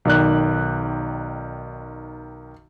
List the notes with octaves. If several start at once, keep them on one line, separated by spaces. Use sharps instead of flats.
B1 D#3 D5 F#6